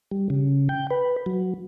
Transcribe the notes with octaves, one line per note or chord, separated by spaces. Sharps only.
G3
C#3
G5
B4
F#3